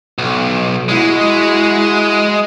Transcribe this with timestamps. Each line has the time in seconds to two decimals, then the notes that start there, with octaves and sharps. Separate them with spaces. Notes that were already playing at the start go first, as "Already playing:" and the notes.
0.18 B1
0.89 G#3 E4 F#4